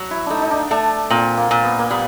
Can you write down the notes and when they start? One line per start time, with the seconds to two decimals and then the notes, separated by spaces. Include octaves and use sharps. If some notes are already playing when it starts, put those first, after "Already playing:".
Already playing: F#3 F#4
0.11 E4
0.26 A3 D4 D#4
0.42 D#4
0.51 D4
0.71 A3 D4
1.10 A#2 C4
1.37 A#3
1.51 A#2
1.63 B3
1.79 A#3
1.90 G3 B3